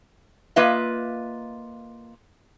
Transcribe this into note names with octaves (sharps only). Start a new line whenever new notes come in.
A#3 F4 B4 D#5 E5